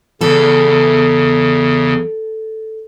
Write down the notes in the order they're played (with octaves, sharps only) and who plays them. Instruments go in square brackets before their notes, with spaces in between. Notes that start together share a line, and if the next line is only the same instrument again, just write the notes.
[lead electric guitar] E2 [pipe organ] C#3 [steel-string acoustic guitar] A4